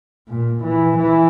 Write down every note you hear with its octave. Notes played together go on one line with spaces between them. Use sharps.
A#2
E3
E3